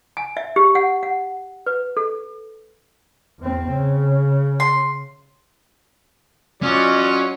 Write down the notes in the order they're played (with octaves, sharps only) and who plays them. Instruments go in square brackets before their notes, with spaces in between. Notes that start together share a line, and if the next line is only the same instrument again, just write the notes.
[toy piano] G#5
E5
G4
F#5
F#5
B4
A4
[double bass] E2 C4
C#3
[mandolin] C6
[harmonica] F#3 F4 [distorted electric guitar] C#4 [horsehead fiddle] D5 D#5